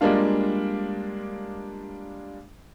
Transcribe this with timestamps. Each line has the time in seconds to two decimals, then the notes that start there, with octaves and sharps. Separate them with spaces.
0.01 G3 G#3 A#3 D4 F4